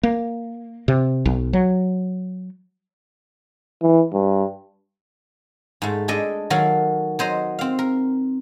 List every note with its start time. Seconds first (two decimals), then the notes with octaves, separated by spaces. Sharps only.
0.03 A#3
0.88 C3
1.25 B1
1.53 F#3
3.82 E3
4.13 G2
5.82 G#2 A3
6.08 G#3 D4 A4 D#5
6.50 D#3 F#3 F#4 A4 F5
7.19 F#3 C5 D#5 A#5
7.59 C4 F5
7.79 A#4